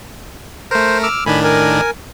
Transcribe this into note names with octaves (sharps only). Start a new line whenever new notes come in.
A3 A#4 C5
D6 E6 F6
A2 D#3 D4 G#5 B5
A#4 G#5